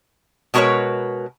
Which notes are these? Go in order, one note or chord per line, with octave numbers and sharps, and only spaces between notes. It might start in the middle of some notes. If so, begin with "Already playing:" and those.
B2 G#3 F#4 A#4 B4 C#5